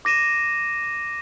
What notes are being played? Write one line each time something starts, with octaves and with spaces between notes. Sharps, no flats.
D6 A#6 D#7 E7